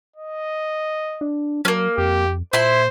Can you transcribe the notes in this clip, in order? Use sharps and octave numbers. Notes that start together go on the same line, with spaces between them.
D#5
D4
F#3 A#3 C#4
F2 G4
A#2 E4 C5 C6